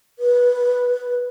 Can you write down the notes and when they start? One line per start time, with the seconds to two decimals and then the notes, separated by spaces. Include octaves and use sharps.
0.19 B4